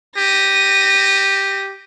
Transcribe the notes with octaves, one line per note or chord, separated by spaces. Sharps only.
G4 A#6 D#7